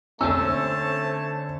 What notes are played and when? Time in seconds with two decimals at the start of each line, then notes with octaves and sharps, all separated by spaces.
0.21 D3 A3 C4 C#4 C5 C#5 A5 E6